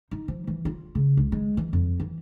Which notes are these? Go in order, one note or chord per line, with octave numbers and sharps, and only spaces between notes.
D#4
F3
E3
F4
C#3
C#2
G#3
E3
F2
E3